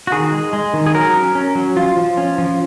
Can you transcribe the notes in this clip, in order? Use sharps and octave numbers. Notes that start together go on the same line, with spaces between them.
F#4
D#3 G#4
G#3
G#3
D#3
G#4
F#3 A#4
C#4
C#4
F#3
F3 F4
F3
C#4
F3